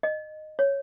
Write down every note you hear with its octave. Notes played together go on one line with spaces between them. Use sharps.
D#5
C#5